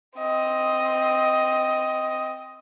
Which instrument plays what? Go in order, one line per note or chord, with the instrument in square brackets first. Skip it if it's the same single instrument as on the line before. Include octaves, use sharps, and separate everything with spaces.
[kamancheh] C4 D#5